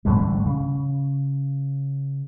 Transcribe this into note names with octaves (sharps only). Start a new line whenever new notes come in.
A1 G#2 D3 G3
C#3